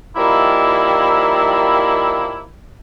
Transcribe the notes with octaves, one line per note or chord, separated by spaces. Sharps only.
D#3 F3 G3 A#3 E4